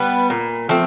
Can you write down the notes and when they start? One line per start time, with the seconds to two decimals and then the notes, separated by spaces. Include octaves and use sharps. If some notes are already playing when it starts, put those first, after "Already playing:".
Already playing: G3 B3 B4
0.30 A#2
0.69 F3 A3 C4